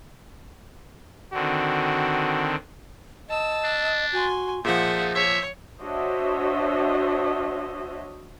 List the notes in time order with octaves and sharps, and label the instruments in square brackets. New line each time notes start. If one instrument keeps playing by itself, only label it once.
[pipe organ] D3 D#3 C4 [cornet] F#4
[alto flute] D#5 [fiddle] A5 E6
[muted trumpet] D4
[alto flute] F#4 [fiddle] G#5 C6
[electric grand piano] A#2 F3 [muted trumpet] D#4 [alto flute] G#4 [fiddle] E5 F#5
[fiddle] C#5 [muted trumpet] E5
[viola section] D4 F#4 C5 C#5 D#5 E5